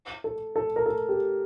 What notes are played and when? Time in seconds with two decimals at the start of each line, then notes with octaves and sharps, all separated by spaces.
0.24 A4
0.56 A4
0.76 A#4
0.86 A4
1.09 G4